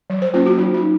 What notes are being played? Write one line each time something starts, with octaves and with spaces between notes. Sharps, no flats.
F#3
C5
A#3 C#4 F4
F#4
F#3 D#4
D#4